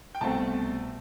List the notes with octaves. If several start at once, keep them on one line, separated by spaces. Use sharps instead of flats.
G5
C2 B2 A3 C4 A5